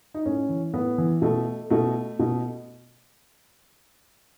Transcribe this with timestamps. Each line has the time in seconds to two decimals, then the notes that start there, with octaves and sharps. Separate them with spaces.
0.14 D#4
0.26 A2 C#4
0.49 E3
0.73 A2 B3
0.98 E3
1.22 B2 A3
1.70 B2 A3
2.19 B2